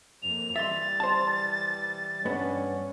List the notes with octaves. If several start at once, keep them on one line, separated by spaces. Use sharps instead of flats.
F2 A#3 F7
E3 G3 E5 C6 A6
C5 A5
G2 B3 C#4 D4